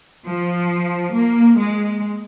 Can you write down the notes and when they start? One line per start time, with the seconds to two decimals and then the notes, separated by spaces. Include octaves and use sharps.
0.25 F3
1.13 A#3
1.57 G#3